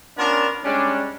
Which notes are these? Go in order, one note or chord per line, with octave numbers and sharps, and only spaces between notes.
B3 C#4 D4 F4 A#4 A5
G3 G#3 C#4 D4